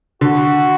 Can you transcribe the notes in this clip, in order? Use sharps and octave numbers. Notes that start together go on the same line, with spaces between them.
D3 F#4